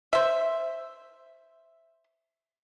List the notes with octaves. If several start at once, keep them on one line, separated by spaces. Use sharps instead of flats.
C5 E5